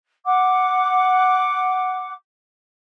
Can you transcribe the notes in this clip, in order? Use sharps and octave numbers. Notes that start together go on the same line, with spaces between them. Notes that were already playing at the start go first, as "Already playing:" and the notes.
F#5 D6